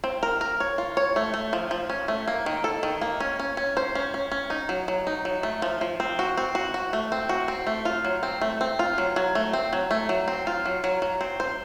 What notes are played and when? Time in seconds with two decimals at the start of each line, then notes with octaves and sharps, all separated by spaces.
0.04 C4
0.23 A#4
0.41 A#4
0.60 C#5
0.78 F4
0.97 C#5
1.16 A3
1.34 A3
1.53 F3
1.71 F3
1.90 C#4
2.08 A3
2.28 A#3
2.46 D#3
2.64 A4
2.83 D#3
3.02 A#3
3.20 C#4
3.39 C#4
3.57 C#4
3.77 C5
3.95 C#4
4.14 C#4
4.32 C#4
4.50 D#4
4.69 F#3
4.88 F#3
5.07 D#4
5.25 F#3
5.43 A3
5.62 F3
5.81 F3
6.00 C4
6.19 F#4
6.38 C4
6.55 F#4
6.74 F#4
6.93 A3
7.12 C4
7.29 F#4
7.48 C4
7.67 A3
7.85 F4
8.05 F#3
8.23 C4
8.42 A3
8.61 C4
8.79 F4
8.98 F#3
9.16 F#3
9.35 A3
9.53 C4
9.73 F#3
9.91 A3
10.09 F#3
10.28 C4
10.47 F4
10.66 F#3
10.84 F#3
11.02 F#3
11.21 C4
11.40 C5